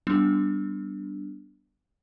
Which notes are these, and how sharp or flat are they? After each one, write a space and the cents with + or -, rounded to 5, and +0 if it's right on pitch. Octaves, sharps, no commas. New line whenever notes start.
G3 -10 B3 +0 D4 +0